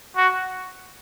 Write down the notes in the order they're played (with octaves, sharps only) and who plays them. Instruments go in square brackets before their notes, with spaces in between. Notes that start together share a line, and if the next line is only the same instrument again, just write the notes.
[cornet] F#4